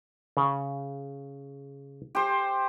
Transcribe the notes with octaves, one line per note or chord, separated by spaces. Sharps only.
C#3
G4 C5